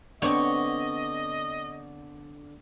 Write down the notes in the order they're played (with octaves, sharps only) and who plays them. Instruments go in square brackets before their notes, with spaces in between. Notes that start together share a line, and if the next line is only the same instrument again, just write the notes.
[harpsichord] D3 [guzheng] B3 C4 [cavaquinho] C#5 C#6 [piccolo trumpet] D#5